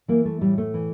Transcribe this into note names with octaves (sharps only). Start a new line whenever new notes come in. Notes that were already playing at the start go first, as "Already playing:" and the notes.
E3 A#3
A3
A2 G3
A3
E3